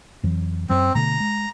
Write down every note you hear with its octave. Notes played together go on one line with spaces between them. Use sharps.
F2 E3 F#3
F#2 F#3 C4
B2 D3 A3 A#5
G#3